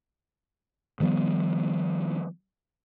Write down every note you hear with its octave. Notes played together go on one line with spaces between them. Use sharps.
D#3 F3 G3 B3